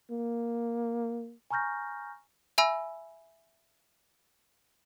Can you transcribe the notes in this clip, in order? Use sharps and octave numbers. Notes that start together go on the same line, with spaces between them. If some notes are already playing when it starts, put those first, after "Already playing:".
A#3
G#5 A#5 C#6 F6 G6 A#6
E5 G#5 B5 E6